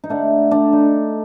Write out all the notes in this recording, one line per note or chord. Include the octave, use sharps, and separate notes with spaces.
D#4
D3 A3 D4
D4
D#4